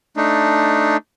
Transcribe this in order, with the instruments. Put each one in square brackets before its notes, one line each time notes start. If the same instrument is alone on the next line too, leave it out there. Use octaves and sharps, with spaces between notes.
[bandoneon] A3 D4 D#4